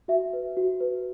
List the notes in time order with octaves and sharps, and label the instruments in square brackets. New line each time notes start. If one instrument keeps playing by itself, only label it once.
[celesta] F#4 E5
B4
F#4
B4